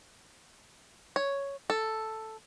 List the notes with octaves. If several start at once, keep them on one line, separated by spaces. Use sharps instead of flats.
C#5
A4